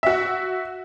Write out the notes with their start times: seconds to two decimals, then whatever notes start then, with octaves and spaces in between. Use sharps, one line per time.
0.03 F#4 E5